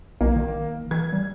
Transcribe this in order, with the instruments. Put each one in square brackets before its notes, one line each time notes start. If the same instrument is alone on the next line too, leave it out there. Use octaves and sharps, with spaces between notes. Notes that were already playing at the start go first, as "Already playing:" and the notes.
[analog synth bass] B1 [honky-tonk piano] A#3
[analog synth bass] D#3
[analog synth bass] E3 [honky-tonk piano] G#6
[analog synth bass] G3